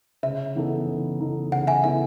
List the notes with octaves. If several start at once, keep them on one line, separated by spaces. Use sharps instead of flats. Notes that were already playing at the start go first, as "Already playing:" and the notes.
C#3 E5
E3 B3 D#4 A4
C#3
E3 B3 D#4 A4
C#3 F#5
E5 G#5
E3 B3 D#4 A4 E5